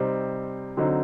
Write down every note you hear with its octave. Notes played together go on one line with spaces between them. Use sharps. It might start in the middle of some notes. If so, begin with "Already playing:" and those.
Already playing: C3 G3 C4 D#4
D3 F#3 C4 D#4